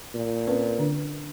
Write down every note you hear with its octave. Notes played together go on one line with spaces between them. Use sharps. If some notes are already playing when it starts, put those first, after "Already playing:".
A#2
C4 C#4 B4
D3 D4